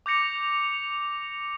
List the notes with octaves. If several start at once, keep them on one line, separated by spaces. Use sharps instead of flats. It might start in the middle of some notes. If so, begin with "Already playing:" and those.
D6 G6 A#6 C#7 F7